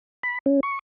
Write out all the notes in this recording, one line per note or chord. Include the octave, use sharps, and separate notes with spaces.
B5
C#4
C#6